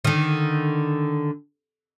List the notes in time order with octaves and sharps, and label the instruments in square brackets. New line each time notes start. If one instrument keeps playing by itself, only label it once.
[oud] D3 D#3